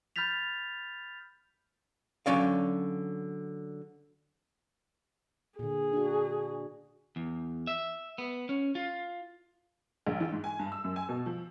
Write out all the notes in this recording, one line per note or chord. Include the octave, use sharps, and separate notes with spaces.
B5 F6 G6 A6 B6 F7
D3 F#3 C#4 D5 F5
A#2 D3 G#4
D4 F#4
E2
E5
B3
C#4
F4
A#1
E3
G#2
G#5
G2
E6
F#2
G#5
B2
F3